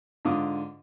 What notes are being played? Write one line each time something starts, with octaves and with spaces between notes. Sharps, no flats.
G#2 D3 F4 D6 D#6